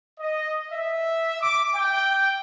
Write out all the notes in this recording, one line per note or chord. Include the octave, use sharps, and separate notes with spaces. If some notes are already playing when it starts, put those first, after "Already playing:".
D#5
E5
D6
G5